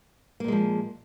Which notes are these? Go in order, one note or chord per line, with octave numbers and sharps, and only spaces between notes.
A#2 F3 G#3 A#3